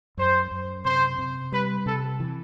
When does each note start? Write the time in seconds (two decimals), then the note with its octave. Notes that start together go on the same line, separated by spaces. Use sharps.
0.17 F#2 C5
0.51 F#2
0.84 C3 C5
1.19 C3
1.52 G3 B4
1.86 C3 A4
2.20 E3